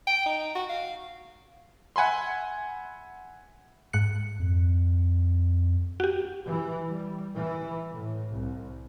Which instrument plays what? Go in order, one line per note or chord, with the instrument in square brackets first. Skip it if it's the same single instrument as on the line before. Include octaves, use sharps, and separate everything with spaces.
[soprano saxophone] G5
D#4
F#4
F5
[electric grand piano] E5 F#5 G#5 B5 C6
[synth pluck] G#2 F#6 C#7
[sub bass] F2
[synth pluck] F#4 G4
[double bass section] E3
G3
E3
A2
C2